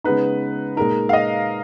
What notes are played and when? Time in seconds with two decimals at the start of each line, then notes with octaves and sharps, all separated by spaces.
0.04 C#3 G#3 B3 D#4 B4
0.77 A#2 G#3 D#4 A#4
1.09 F5
1.13 D#5